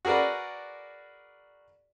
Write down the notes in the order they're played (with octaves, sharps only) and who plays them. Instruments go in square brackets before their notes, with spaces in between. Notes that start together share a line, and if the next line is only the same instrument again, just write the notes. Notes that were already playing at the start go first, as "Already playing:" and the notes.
[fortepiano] F#4 G#4 A#4 B4 D5